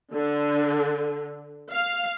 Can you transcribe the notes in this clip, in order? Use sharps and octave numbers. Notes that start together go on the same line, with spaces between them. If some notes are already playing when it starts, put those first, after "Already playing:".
D3
F5